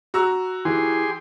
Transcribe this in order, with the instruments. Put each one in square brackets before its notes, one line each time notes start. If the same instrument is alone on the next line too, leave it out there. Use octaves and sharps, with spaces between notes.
[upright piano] F#4 A#5 E6
[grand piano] E3 [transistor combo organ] G4 G#4 C6